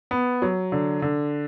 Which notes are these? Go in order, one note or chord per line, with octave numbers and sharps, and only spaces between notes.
B3
F#3
D3
D3